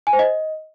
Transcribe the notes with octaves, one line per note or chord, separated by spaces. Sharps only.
G#5
C5
D#5